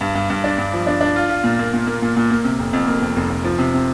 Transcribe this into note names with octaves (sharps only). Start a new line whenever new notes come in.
G2
G2
G2
D4
G2
F3
D4
D4
F4
F4
A#2
A#3
A#2
A#3
A#2
A#2
A#3
C3
F1
F2
A#3
F2
F1
F1
F3
C3
C3